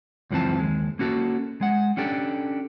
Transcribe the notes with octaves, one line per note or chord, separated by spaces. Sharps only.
C#2 F#2 E3 F3 C4 A5
D#2 G#3
A#3 C#4 F#4 G4 A4
G#3 F#5
C#4 D4 G4 A4